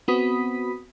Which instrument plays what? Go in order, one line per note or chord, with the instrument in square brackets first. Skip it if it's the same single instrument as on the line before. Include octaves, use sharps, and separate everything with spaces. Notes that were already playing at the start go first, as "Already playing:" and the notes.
[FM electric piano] B3 C4 F#4 B5 D#6 B6